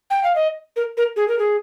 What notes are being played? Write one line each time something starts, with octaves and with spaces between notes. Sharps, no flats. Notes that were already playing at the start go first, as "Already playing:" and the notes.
G5
F5
D#5
A#4
A#4
G#4
A#4
G#4